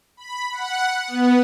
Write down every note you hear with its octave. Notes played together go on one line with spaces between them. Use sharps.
B5
F#5
B3